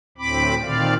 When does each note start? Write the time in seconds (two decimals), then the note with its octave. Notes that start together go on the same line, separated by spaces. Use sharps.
0.18 D2 A2 C4 B5 D6
0.62 A#2 D#3 C4 D5 F5